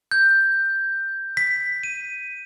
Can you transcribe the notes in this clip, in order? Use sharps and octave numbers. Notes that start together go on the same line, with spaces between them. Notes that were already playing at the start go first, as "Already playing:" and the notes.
G6
B6
D#7